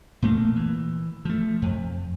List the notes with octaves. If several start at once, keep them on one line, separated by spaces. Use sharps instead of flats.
A#2 A3 A#3
E3
F3 A3
F2